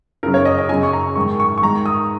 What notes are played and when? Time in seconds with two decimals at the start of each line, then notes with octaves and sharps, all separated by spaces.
0.23 F#2 C#3 A#4
0.34 C#5
0.45 D#5
0.58 D#5
0.69 F#2 C#3 G#5
0.83 C#6
0.93 A#5
1.15 G#2 D#3 C#6
1.40 C#6
1.58 C#6
1.62 G#2 D#3 A#5
1.86 D#6